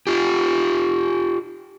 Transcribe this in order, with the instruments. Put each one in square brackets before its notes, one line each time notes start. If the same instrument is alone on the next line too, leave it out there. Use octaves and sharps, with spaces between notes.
[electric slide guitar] F4 G4